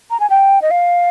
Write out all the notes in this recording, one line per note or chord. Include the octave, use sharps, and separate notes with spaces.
A#5
G#5
G5
D#5
F5